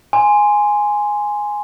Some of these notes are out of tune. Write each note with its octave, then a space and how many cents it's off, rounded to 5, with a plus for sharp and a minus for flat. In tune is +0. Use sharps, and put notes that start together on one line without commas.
G#5 +0 C6 -5